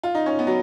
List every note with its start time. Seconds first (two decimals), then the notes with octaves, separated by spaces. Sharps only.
0.03 F4
0.15 D#4
0.26 C#4
0.39 B3
0.47 F#3